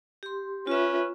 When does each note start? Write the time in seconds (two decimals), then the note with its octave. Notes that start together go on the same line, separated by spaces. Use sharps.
0.23 G4 C6
0.67 C#4 F4 B4 E5